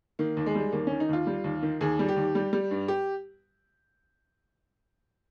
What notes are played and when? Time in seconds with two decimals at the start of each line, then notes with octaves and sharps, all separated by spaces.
0.19 D#3 A#3
0.37 D#2
0.46 G#3
0.55 G3
0.72 D#2 A#3
0.87 D#3 C#4
1.00 D#4
1.09 D#2 F4
1.27 G3
1.44 D#2
1.63 D#3
1.81 D#2 G#4
1.99 G3
2.08 G4
2.16 D#2
2.35 G3
2.53 G3
2.71 G2
2.88 G4